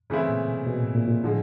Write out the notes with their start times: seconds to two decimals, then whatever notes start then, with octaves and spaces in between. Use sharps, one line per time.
0.10 G2 C#3 E3 A3 C4 E4
0.29 A#2
0.48 B2
0.67 B2
0.74 A#2
0.80 A2
0.95 A#2
1.08 A#2
1.23 A2 D3 F3 G#3